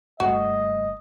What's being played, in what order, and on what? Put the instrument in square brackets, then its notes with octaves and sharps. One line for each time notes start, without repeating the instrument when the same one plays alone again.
[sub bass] F#1 [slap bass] G2 A3 [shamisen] F#4 [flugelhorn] D#5